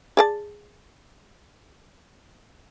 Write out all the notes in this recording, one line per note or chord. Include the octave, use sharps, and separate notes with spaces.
G#4 D5 A5